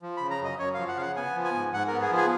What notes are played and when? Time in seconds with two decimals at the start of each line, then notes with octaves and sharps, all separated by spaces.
0.02 F3
0.17 C#3 B5
0.30 A#5
0.41 F#2 D#5
0.59 F#2 C#5
0.74 F3 F5
0.88 F#5
0.97 C#3 F5
1.02 F#5
1.16 B3 G#5
1.36 F3
1.45 G#5
1.55 G#2
1.73 G#2 F#5
1.87 B3 A#4
2.01 G#4
2.11 F3
2.17 G#4